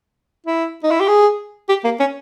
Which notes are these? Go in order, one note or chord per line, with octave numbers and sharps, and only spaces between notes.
E4
D#4
E4
G4
G#4
G4
A#3
C#4